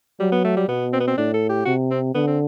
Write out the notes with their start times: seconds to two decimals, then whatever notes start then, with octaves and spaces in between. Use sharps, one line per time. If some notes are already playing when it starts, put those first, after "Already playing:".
0.20 F#3 G3
0.32 B3
0.45 A3
0.57 G3
0.68 B2 B3
0.93 C4
1.00 B3
1.07 C4
1.17 A2 D4
1.34 A4
1.49 G4
1.65 C3 F#4
1.91 C4
2.15 D3 B3
2.27 C4